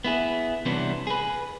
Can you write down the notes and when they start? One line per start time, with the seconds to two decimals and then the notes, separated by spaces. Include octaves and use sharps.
0.04 B3 E4 G#4
0.66 C3 E3 G3 B3 C#4 D4
1.07 G#4 B4